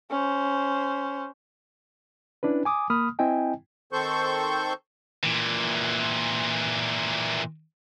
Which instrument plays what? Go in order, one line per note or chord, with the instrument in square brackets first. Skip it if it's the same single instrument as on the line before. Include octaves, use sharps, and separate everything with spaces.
[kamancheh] C#4 C5
[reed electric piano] C#4 D4 E4 B4
G#5 D6 D#6
A#3 B5 D#6 F6
C4 E4 D#5 G5 G#5
[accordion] D#3 C4 A4 C5 C#6 G6
[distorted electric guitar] A#2 E3